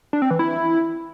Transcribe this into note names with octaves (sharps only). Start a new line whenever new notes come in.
D4
C4
E3
E4